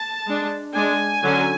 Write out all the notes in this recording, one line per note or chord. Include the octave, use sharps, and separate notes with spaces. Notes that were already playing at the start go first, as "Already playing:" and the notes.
Already playing: A5
G#3 D4
G#3 D4 G#5
D3 F#3 C#4